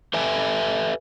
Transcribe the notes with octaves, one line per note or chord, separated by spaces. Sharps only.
G4 A4 B4 E5 G5 G#5